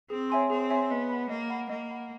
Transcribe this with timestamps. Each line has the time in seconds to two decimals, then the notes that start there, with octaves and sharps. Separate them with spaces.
0.10 C4 G#4
0.30 C#5 E5 G#5 C6
0.50 C4 G#4
0.70 C#5 E5 G#5 C6
0.90 B3 D#5
1.09 F#5 B5
1.29 A#3 D#5
1.50 F#5 B5
1.69 A#3 D#5
1.90 F#5 B5